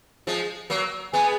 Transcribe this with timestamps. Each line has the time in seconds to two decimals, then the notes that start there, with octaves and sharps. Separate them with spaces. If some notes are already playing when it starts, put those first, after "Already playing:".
0.27 F3 G#3
0.70 F#3 A#3
1.13 G#3 B3 G#5